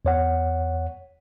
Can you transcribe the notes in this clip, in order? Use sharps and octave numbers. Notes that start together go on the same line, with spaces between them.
E2 C#5 F#5